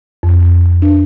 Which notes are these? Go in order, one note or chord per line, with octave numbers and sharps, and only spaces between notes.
F2
D4